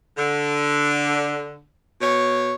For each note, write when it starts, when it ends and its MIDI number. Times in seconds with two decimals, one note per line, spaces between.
0.18 1.65 50
2.01 2.53 47
2.01 2.53 73